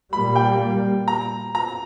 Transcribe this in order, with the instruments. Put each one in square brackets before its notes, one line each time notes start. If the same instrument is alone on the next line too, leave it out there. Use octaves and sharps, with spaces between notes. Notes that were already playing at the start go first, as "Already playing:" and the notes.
[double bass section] A#2 G3 A#3 [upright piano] B5
[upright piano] G5
A#5
A#5